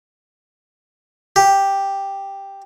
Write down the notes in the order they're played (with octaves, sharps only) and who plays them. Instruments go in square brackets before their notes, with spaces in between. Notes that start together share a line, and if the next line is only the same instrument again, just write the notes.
[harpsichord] G4